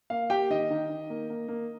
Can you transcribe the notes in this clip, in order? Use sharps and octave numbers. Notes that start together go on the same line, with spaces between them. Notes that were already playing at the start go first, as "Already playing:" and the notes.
A#3 F5
A#3 G4 G5
D#3 D#5
D#3
D#3
A#3
A#3
A#3